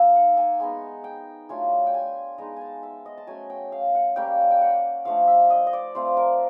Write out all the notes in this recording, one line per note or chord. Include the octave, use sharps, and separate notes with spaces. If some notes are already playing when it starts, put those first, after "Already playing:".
Already playing: A#3 D#4 E5
F#5
G#5
G#3 B3 D#4 G#5
G5
F#3 A3 D4 F4 G#5
G5
G#5
G#3 B3 D#4 A#5
G#5 A5
E5
D#5
A5
F#3 A3 C#4 G#5
G5
F5
F#5
G3 A#3 C#4 G5
G5
F#5
F3 A3 D4 F5
E5
D#5
D#5
D5
A3 C4 F4 C5
A#4